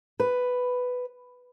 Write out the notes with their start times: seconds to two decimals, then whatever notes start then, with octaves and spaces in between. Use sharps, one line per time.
0.20 B4